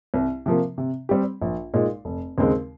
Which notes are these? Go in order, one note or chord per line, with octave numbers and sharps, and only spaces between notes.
C2
C3 F3 A#3
C3
G3 C4 G4
A#1
A#2 G#3 D#4
F1
D#2 C#3 G#3 C4